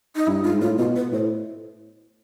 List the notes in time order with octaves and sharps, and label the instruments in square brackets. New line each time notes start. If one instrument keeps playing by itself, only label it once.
[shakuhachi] D#4
[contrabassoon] G2 [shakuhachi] E4
[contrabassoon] G#2 [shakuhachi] F4
[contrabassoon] A2 [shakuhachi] F4
[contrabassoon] B2 [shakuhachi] F4
[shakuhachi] B4
[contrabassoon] A2 [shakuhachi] C5